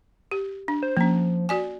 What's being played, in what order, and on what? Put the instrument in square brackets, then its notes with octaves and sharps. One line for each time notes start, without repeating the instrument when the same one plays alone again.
[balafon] G4
D4
[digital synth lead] C5
[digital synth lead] F3 [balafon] A#3 C#4
[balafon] F#4 D5 G#5